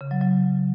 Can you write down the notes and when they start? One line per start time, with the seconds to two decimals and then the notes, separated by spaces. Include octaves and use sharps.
0.01 C#3
0.11 F#3
0.21 F#3